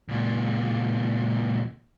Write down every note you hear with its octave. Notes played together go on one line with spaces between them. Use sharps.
C#2 A#2